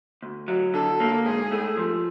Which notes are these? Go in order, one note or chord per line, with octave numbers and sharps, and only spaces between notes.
D2
F#3
D3 A4
A#3
G#2 G#4
A3
F3